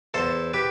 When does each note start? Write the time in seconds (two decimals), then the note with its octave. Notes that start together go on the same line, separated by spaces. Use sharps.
0.14 E2 A4 C5
0.54 G4 B4